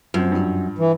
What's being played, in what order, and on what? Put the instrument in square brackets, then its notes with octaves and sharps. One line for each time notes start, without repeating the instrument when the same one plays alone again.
[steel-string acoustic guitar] F#2 [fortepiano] F3 C4
[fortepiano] G2 F3
[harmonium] E3